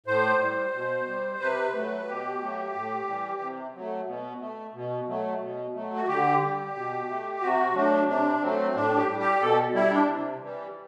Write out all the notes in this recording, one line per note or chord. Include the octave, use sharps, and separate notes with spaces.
A2 C5
G3
B2
G3
C3 B4
F#3 A3
B2 G4
F#3 A3
A2
E3 G3
C3
F#3 A3
B2
A3
B2
F#3 A3
B2
F#3 A3
F#4
D3 G4
G3
B2
A3
C3 F#4
F#3 A3 D4
C3 D4
F#3 A3 C4
A2 D4
G4
G3
G4
B2 A4
G3 E4
D4
C3
E3 G3